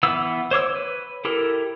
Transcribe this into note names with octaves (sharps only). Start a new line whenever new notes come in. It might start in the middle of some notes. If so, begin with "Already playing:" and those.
E3 B3 E6
C5 C#5 D6 E6
B4
E4 G4 A4 A#4